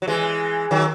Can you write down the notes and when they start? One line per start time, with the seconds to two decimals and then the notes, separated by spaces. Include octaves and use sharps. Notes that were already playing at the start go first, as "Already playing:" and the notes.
0.02 F#3
0.08 E3 G#3
0.71 D#3 F#3